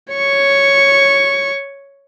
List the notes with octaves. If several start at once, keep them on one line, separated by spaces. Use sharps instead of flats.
C#5 C#6